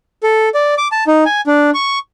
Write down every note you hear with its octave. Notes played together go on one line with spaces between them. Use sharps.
A4
D5
D6
A5
D#4
G#5
D4
C#6